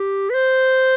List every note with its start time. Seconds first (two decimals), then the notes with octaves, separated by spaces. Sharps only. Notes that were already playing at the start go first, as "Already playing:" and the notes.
Already playing: G4
0.30 B4
0.34 C5